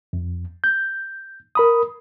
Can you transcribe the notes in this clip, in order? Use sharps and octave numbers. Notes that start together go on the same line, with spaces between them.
F2
G6
A#4 B5 D#6